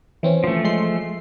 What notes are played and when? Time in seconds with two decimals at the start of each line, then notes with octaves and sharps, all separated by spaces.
0.23 E3 C4 C#4
0.44 F3 A3
0.64 G#3 C6 C7